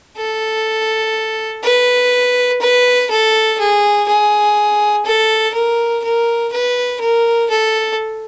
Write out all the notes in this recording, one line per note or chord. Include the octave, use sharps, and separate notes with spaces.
A4
B4
B4
A4
G#4
G#4
A4
A#4
A#4
B4
A#4
A4